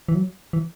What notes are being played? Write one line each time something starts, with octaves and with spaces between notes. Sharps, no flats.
E3
F#3
E3